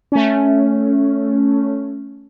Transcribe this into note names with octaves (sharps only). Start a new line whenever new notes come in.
A3 C#4